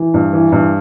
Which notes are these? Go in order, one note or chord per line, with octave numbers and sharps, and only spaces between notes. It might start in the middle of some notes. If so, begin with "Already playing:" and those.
Already playing: E3
G2
E3
G2